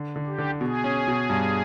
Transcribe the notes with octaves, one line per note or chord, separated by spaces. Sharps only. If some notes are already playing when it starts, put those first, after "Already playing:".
Already playing: D3
D3
G4
D3
B2 G#4
C#4
B2
G2